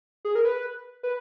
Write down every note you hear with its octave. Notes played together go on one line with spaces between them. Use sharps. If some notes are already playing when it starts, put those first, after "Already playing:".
G#4
A#4
B4
B4